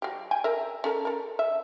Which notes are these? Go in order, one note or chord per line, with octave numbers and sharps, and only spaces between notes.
F#3 G4
G5 G#5
A#4 E5
C#4 A4 A#4
A4 A#4
E5